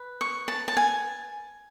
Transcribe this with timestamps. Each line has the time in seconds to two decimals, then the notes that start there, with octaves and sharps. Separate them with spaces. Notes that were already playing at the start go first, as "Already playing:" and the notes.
Already playing: B4
0.21 C#6
0.48 A5
0.68 A5
0.77 G#5